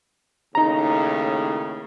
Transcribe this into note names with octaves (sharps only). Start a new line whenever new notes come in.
D#2 A2 C#3 D#4 A#5